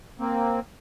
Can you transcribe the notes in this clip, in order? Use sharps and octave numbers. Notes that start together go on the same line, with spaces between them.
A#3 C4